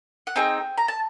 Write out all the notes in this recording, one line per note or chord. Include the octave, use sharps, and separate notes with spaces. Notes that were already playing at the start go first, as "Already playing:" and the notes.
F#5
C4 D#4 G#4 G5
A#5
A5